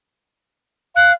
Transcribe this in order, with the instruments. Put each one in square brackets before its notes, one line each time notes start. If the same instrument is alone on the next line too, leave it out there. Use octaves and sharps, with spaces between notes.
[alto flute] F5 [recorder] F#6